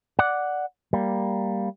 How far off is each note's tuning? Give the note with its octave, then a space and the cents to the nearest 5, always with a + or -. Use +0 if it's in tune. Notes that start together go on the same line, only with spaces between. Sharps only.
D5 +0 F#5 +0
G3 +0 A#3 +0